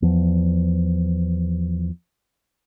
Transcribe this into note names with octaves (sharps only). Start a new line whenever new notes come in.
E2 F3